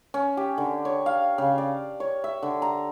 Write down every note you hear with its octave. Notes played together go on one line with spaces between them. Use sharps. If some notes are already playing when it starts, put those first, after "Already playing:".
C#4
G4
D3
C#5
F5
C#3
D5
C#5
E5
D3
A#5